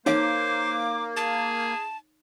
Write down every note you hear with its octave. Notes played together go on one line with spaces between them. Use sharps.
A#3 D#4 C5 C#5 F5 D6
G#4 A5